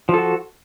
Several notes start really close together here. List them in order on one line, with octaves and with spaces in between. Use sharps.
F3 A4 F#4